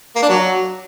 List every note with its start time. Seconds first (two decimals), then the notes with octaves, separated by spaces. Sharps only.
0.16 A#3
0.23 D4
0.29 F#3